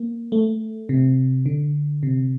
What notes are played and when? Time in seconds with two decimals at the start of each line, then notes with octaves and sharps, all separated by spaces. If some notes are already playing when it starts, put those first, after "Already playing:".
Already playing: A#3
0.32 A3
0.89 C3
1.46 D3
2.03 C3